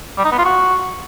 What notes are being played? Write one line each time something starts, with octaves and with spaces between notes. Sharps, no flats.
G3
D#4
B3
F4
F#4